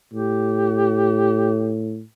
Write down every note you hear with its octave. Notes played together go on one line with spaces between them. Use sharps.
A2 G4